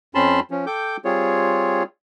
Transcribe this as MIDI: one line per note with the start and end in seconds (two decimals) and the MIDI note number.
0.15 0.40 41
0.15 0.40 60
0.15 0.40 61
0.15 0.40 81
0.15 0.40 83
0.15 0.40 84
0.51 0.65 53
0.51 0.65 61
0.67 0.97 69
0.67 0.97 79
0.67 0.97 86
0.67 0.97 91
1.05 1.83 55
1.05 1.83 60
1.05 1.83 65
1.05 1.83 68
1.05 1.83 73